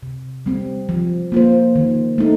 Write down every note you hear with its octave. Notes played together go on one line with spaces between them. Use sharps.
C3
G3 C4
F3
A#3 F4 C5
D#3
A3 D#4